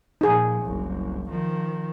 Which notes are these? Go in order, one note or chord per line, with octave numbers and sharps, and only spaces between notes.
A#2 F3 D#4 G#4
F#1 C2
D#3 F3